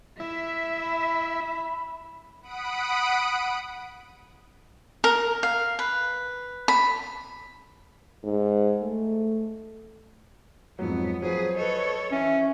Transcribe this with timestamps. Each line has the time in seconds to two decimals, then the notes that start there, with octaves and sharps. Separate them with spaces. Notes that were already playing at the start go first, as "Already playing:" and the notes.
0.20 E4 E5
0.80 B5
2.42 F#5 B5 D#6 D7
5.04 A#4
5.43 F5
5.79 B4
6.68 B5
8.24 G#2
8.82 A3
10.79 F2 G#2 F#3 B3
11.22 F3 F#3 G#4 B4 C5
11.56 A4 B4 C#5 D#5
12.12 E3 C#4 E5